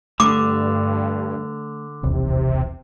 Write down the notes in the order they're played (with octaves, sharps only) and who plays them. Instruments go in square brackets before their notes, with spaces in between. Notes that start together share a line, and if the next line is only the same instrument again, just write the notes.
[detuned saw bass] G2 [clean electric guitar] D3 [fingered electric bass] A3 [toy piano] D6
[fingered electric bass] D#1 B1 E2 [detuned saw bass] C3